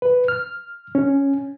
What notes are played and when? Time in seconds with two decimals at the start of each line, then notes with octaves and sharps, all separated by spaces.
0.02 B4
0.28 F6
0.95 C#4